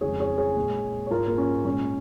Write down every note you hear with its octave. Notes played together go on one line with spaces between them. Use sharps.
F2 C#3 G#3 G#4 C#5
G#4 C#5
G#4 C#5
A#2 G#3
C#5
G#2 G#3 F4 A#4
A#3
C#4
A#2 G#3 C#4